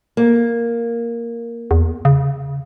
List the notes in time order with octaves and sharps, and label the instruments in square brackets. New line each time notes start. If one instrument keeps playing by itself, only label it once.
[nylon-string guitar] A#3
[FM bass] E2
C#3